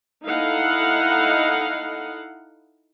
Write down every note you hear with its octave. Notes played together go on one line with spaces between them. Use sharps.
D#4 E4 A4 D#5 F5 F#5